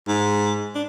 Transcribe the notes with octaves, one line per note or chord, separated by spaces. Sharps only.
G#2
D4